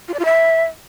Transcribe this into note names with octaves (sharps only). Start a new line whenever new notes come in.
F4
D5
F4
E5